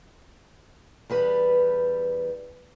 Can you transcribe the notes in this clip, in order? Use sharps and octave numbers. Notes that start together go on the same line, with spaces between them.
E2 G3 B4